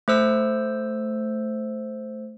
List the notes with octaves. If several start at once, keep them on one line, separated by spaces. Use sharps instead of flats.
A3 C5 E6